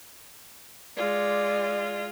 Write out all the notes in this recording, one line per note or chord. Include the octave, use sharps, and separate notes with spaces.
G#3 F4 D5